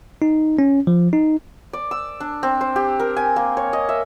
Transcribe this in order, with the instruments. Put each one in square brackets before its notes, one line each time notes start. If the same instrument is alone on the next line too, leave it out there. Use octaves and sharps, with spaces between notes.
[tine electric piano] D#4
C#4
F3
D#4
[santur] D5
E6
D4
C4
C5
G4
A#4
G#5
A#3
C#5
D#5
E5